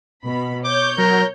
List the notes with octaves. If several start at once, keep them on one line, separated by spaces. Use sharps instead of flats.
B2 B5
C#5 D6 G6
F#3 A#4